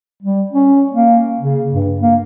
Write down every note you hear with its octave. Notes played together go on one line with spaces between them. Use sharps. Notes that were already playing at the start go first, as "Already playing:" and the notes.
G3
C#4
A#3
C#3
G2
A#3